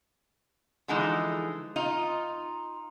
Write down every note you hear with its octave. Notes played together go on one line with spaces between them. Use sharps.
D3 E3 F3 G#3 D#4
D#4 F4